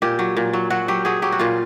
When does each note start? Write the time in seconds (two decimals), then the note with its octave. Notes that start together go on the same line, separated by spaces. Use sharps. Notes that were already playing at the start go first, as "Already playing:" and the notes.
0.02 A#2 G4
0.19 F#3
0.37 A#2
0.53 F#3
0.70 F#3 F#4
0.88 F#3 G4
1.05 F#3 G#4
1.22 F#3 G4
1.32 F#4
1.39 A#2 F4